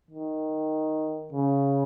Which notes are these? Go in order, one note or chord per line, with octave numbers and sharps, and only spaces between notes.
D#3
C#3